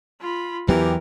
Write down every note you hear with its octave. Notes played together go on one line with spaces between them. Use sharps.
F4 B5
E2 E3 F#3 B3 G4 A#4